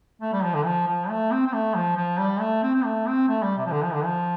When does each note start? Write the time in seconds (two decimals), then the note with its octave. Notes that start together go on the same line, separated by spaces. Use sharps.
0.22 A3
0.33 G3
0.43 F3
0.54 D3
0.66 F3
0.88 F3
1.10 A3
1.31 C4
1.47 C4
1.53 A3
1.75 F3
1.97 F3
2.18 G3
2.40 A3
2.63 C4
2.75 C4
2.84 A3
3.06 C4
3.28 A3
3.42 G3
3.57 C3
3.66 F3
3.72 D3
3.83 F3
3.93 D3
4.05 F3